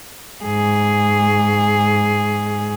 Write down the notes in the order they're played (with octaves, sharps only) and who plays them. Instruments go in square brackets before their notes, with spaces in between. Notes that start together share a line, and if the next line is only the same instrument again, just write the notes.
[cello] G#2 G#4